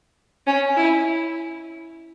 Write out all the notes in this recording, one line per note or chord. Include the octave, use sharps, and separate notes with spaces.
C#4
E4